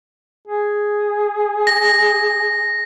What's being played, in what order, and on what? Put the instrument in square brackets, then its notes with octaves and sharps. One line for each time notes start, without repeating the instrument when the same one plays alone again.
[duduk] G#4
[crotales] A#6